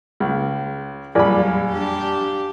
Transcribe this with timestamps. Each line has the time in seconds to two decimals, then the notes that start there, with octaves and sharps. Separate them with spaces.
0.20 C#2
1.15 A#1 F2 F#3 G3 D5 G#5 B5
1.72 D4 G4